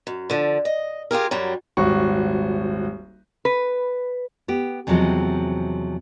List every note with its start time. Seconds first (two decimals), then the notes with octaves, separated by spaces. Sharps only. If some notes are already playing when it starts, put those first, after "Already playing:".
0.07 F#2
0.30 D3 F3
0.65 D#5
1.11 F4 G4 G#4 A#4
1.31 F#2 F#3 G3
1.77 D#1 G#1 F#4 C#6
3.45 B4
4.48 B3 G4
4.87 E2 C3 F3 F#3 G#3 C4